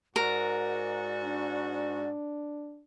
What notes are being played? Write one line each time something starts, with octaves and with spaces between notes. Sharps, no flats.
G#2 F#4 A#4 D5
D4